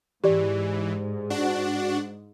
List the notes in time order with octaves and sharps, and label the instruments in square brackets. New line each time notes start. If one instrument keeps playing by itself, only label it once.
[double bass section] G#2 [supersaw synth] E3 [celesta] G4 D5
[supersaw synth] D4 F#4 F#5